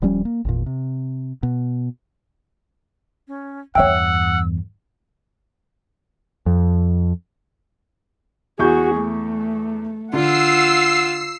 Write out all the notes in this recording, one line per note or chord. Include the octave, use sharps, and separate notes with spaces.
D#1 F3 G3 C#4
A#3
G#1 E2 A#2
C3
B2
C#4
E2 G2 C#5 E5 F#5 G5 E6
F2
E2 F#4 G#4 C#6 G6
A3
D3 F4 F#5 E6 C7